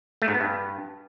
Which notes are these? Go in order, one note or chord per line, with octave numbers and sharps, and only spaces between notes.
A3
G#2
B3
G2